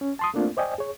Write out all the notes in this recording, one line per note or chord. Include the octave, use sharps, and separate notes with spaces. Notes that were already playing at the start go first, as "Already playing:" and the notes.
C#4
A5 C6 D#6
A3 A#3 C4 D4 F4
C5 D5 D#5 G5 G#5
G#4 C#5